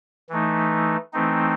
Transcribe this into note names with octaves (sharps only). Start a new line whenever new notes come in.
E3 A3 D#4
E3 A3 C4 D#4